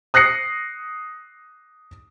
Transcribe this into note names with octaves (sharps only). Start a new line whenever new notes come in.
D#6 F#6 A#6 C7 C#7